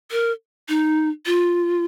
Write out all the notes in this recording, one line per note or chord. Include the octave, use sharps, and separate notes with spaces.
A#4
D#4
F4